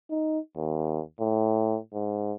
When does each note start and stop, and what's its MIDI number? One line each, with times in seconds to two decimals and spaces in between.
0.10 0.39 63
0.56 1.01 39
1.20 1.78 45
1.94 2.33 44